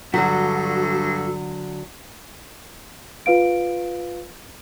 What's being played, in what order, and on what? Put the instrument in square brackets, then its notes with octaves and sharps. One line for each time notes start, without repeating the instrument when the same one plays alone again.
[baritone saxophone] G2 [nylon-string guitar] D3 F#3 [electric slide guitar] F#4 [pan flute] A4
[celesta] F4 B4 F5 D7